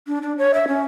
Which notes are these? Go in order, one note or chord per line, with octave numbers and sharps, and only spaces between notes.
D4
D4
C#5
E5
C#4